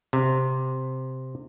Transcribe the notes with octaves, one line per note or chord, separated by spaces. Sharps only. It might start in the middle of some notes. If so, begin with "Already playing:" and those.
C3